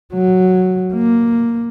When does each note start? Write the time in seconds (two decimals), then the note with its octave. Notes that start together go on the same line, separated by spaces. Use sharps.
0.13 F#3
0.94 A#3